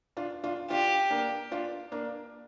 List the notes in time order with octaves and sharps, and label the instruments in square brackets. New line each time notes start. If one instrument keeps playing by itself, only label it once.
[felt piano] D4 F4
D4 F4
[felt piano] D4 F4 [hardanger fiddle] G4
[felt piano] A#3 D4
D4 F4
A#3 D4